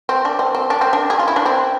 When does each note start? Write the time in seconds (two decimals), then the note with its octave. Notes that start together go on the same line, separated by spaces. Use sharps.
0.09 C4
0.25 D4
0.39 C4
0.55 C4
0.70 D4
0.81 C4
0.93 D4
1.10 G#4
1.19 F4
1.28 E4
1.36 D4
1.46 C4